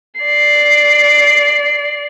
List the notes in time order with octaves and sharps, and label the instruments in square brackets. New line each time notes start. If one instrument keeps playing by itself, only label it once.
[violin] D5 C7